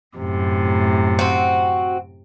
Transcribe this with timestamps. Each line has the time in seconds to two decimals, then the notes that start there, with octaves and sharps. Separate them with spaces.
0.18 F#2 A2 C3
1.19 C4 F#4